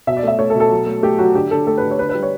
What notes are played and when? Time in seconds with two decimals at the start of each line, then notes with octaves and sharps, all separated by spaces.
0.07 B2 E5
0.17 D5
0.23 A3 E5
0.39 A3 C#5
0.50 A4
0.55 B2
0.60 A4
0.71 F#3
0.87 A3
1.02 A3 G4
1.18 F#3 F#4
1.34 D3 G4
1.50 D3 A4
1.67 A3 A4
1.78 B4
1.82 D3
1.91 C#5
1.98 D3 B4
2.09 B4
2.15 G3
2.23 C#5